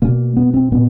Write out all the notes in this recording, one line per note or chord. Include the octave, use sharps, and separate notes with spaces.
B2 A#3
B3
C4
A#2 B3